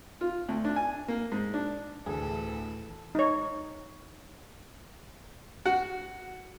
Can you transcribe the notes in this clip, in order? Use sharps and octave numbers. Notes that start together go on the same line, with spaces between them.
F4
D2
D4
G#5
A#3
G#2
D4
D2 A2 E3 G#4 A4
D#4 C#5
F#4